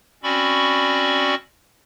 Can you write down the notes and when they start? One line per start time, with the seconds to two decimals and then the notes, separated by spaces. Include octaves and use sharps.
0.23 C4 C#4 F#4 D5 B5 C#6